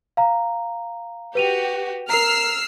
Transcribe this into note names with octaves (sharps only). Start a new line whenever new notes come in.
F5 A#5
F#4 G4 B4 D#7 F7
A#4 A#5 E6 F6 C7